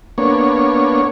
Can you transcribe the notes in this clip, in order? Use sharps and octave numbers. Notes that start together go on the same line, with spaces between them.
A#3 B3 D4 C#5